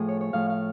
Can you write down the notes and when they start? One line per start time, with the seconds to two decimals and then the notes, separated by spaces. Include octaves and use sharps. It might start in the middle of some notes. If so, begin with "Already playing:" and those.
Already playing: A2 F3 G#4
0.08 C#5
0.21 C#5
0.33 A2 F3 F5
0.49 F5